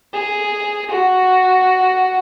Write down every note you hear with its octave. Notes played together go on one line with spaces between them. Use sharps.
G#4
F#4